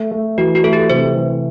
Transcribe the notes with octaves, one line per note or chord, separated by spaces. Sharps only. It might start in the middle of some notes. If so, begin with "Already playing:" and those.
Already playing: A3
A3
E3 F#4
F#4
A3 A4
G4
C3 C5
E3